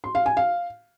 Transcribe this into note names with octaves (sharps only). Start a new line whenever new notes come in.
C6
F5
G#5
F5